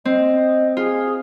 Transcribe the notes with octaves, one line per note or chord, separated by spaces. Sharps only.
C4 D#5
F4 G#4